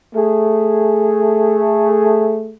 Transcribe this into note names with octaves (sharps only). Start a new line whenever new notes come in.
A3 G#4